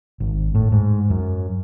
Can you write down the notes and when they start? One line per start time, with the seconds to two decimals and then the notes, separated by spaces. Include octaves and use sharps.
0.20 G#1
0.55 A2
0.72 G#2
1.10 F#2